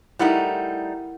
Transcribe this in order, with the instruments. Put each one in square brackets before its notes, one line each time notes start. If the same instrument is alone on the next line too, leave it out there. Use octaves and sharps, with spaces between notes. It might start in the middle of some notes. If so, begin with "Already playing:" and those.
[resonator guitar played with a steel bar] G3 A3 D#4 [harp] E4 A#4 F#5